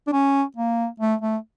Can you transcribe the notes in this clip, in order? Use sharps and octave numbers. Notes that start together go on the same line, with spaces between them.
D4
C#4
A#3
A3
A3